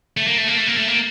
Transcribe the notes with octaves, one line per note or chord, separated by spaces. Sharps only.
A3
A#3
A3
A#3
A3
A#3
A3
A#3